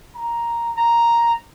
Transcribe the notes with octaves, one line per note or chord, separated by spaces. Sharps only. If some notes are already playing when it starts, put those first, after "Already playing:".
A#5
A#5